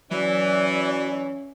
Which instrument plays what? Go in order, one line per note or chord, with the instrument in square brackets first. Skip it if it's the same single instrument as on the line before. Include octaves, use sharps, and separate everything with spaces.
[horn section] E3 [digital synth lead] F#3 [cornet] C#4 [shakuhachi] D5